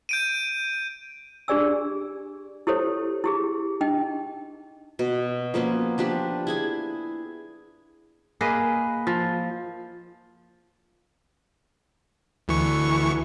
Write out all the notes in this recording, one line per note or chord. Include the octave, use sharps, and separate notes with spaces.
G6 D7 D#7
D4 G4 G#4 D5 G#5 E6
E4 G4 A4 C5 C#5
E4 G4 G#4
D4 D#4 D#5 G5
B2
F3 A#3 B3 C#4
F3 D4 G4 B4
E4 G#4 G#5
A#3 G#4 B4 D#5
F3
D2 E3 C#6